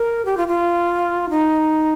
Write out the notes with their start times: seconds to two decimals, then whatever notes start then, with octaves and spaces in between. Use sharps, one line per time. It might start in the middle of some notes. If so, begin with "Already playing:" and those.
Already playing: A#4
0.25 G4
0.37 F4
0.48 F4
1.30 D#4